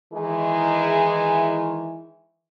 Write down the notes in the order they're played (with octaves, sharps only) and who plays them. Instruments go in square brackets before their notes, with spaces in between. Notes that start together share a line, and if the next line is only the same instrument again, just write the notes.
[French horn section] D#3 E3 G#3 E4 G#4